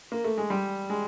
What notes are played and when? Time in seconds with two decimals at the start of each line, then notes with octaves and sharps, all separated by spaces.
0.12 A#3
0.24 A3
0.38 G#3
0.50 G3
0.90 G#3